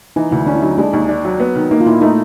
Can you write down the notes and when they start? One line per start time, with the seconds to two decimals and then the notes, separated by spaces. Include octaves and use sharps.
0.16 E3 D#4
0.31 D2 E4
0.47 C#4 D4
0.55 E4
0.62 F#3 D#4
0.78 G#3 D4
0.93 D#2 D#4
1.09 D4
1.25 F#3
1.40 B3
1.55 D#3
1.71 A#3 D#4
1.80 F4
1.86 A#2 E4
2.01 A3 D#4